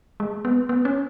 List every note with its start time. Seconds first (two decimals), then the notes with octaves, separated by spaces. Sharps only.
0.20 G#3
0.45 B3
0.69 B3
0.85 C#4